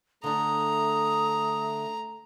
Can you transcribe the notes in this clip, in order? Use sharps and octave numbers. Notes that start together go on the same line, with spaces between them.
D3 A3 D4 A#5 D#6